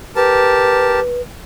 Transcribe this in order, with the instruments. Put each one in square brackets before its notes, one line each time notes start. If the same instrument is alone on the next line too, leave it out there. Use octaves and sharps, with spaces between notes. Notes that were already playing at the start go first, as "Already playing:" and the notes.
[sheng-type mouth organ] G4 A#4 A5 [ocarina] B4